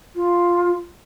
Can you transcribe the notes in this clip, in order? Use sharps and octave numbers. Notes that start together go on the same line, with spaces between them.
F4